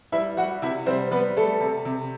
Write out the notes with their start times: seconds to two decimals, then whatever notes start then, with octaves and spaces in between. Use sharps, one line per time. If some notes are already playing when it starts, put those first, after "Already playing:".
0.12 G3 E4 E5
0.37 G3 F#4 F#5
0.62 C3 E4 E5
0.86 G3 C4 C5
1.11 G3 B3 B4
1.37 G3 A3 A4
1.61 C3
1.85 C3